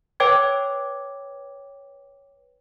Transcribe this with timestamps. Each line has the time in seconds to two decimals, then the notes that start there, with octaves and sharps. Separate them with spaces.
0.20 B4 C#5 G5 D6 G#6